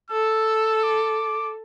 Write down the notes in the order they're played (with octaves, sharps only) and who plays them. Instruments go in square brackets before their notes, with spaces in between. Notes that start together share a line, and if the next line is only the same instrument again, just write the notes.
[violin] A4 [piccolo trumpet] E6
[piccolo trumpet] D6